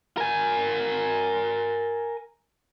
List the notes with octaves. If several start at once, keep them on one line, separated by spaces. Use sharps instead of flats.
A#4 G#5